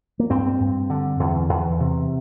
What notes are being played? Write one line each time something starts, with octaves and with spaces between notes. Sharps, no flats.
A#3
G2 C4
G2
D3
E2
E2
C3